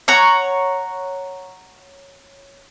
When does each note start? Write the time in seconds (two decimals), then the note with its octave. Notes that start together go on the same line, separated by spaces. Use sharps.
0.08 C#5 F#5 A#5